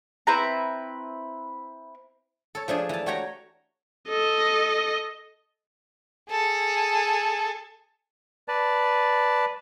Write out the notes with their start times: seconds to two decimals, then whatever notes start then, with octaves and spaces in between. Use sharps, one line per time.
0.27 C4 E4 B4 A#5
2.55 A4 C#5
2.68 F3 A3 D4 G#4
2.89 E3 A5
3.06 A3 F#4 G4 C#5 G5 A#5
4.09 A4 D#5
6.30 G#4 A4
8.48 B4 D5 A5